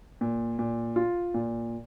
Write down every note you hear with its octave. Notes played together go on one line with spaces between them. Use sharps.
A#2
A#2
F4
A#2